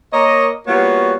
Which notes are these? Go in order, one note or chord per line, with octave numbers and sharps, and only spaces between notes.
A#3 A#4 C#5 D#5
G3 A#3 B3 F4 F#4 C#5